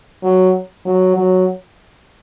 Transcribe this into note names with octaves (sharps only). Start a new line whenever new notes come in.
F#3
F#3
F#3